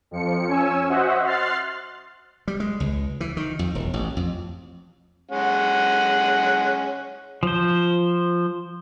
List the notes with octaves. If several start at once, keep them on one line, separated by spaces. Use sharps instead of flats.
F2 F3 C#7
C#4 G#5 E6
F#4 C5 D#5 E5 F#5
C6 F6 F#6 A6 C7
G3
G#3
C#2
E3
D#3
F2
E1
A1
F2
G#3 C#4 F#5
F3 C5